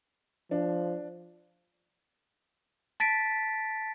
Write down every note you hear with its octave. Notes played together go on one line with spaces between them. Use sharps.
F3 D4
A5 A6 B6 D7